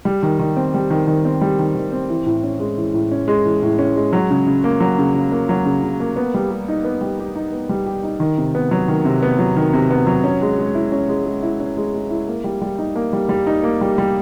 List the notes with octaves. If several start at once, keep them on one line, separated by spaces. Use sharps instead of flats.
G3
D#3
D#3
C4
G3
D#3
D#3
C4
G3
D#3
D#3
C4
E3
A2
C#4
G#3
E3
A2
C#4
G#3
E3
A2
C#4
G#3
F#3
C#3
C#3
A#3
F#3
C#3
C#3
A#3
F#3
C#3
C#3
A#3
B3
G3
G4
D#4
B3
G3
G4
D#4
B3
G3
G4
D#4
D#3
C3
B3
F#3
D#3
C3
B3
F#3
D#3
C3
B3
F#3
C#4
G#3
G#3
E4
C#4
G#3
G#3
E4
C#4
G#3
G#3
E4
A#3
G3
G3
D#4
A#3
G3
G3
D#4
A#3
G3
G3